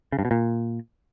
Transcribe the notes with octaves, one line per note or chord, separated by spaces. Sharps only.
C#3
G2
B2
A#2